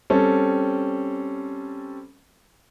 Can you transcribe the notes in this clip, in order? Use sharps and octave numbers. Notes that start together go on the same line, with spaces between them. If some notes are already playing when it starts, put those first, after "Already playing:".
G3 C4 C#4 A4